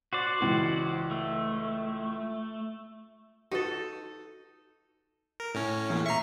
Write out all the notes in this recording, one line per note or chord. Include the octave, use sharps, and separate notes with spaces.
F#4 C5 D5
C#2 E3
A3
D#4 F4 F#4 A4 B4
A#4
A2 C#4
E2 A#2
E5 A#5 C#6 C7